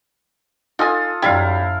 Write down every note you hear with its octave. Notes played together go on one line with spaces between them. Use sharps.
D#4 F4 A4 G#5 D#6
F#2 G3 D#4 E4 F5